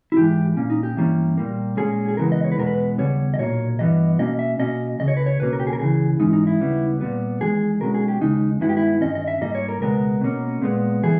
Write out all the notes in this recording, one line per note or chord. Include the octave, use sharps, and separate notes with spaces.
E4
G#2 E3 G#3 G4
A#2 A#3 C#4
D#4
G4
G2 E3 G3 A#3 C#4
A#2 G3 A#3
A#2 G#3 C#4 G#4
G#4
C#2 C#3 E3 G#3 B3 A#4
D#5
C#5
B4
E2 B2 G#3 B3 A#4
B4
D#2 C#3 G3 B3 C#5
D#5
B1 A#2 A#3 C#5
G2 E3 G3 B3 D#5
B2 A#3 C#4 D#5
E5
B2 A#3 C#4 D#5
C#2 C#3 D#5
C#5
B4
C#5
C#2 B2 A#3 C#4 B4
A#4
G4
G#4
A#4
C#2 C#3 E3 G#4
G#2 E3 G#3 C#4 D#4
D#4
E4
D#2 C#3 G3 B3
A#2 G3 B3
E2 D#3 G#3 G#4
B1 B2 G#3 C#4 A#4
G#4
G4
D#2 C#3 G#3 D#4
G2 D#3 G#3 B3 E4
G4
E4
G2 D#3 G#3 C#4 D#5
D#5
E5
G#2 G3 A#3 D#5
C#5
A#4
C#2 B2 G#3 B3 A#4
B2 A#3 C#4
A#2 G#3 B3
E3 G3 G#4